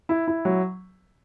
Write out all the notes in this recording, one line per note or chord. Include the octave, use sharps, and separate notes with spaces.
E4
E4
F#3